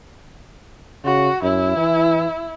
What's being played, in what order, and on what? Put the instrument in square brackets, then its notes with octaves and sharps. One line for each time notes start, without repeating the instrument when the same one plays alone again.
[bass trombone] C#3 [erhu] F#4
[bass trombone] F#2 [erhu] E4
[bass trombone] E3